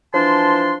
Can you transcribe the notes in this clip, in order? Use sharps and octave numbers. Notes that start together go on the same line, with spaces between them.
E3 F3 D4 A5 C6